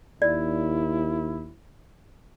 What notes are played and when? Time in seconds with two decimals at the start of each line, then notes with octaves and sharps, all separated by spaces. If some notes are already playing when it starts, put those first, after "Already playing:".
0.22 D#2 E4 D5